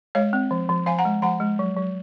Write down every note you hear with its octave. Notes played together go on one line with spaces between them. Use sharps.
G#3 C#5 F5
C4
F3
F3
F3 F5 G#5
F#5 A#5
G#3
F3 F#5 A#5
G#3
F#3
F#3